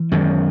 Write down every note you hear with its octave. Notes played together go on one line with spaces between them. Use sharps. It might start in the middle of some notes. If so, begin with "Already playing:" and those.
Already playing: E3
F#2 D#3 G#3